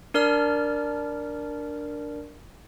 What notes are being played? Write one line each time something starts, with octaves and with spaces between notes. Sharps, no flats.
D4 A#4 D5 F6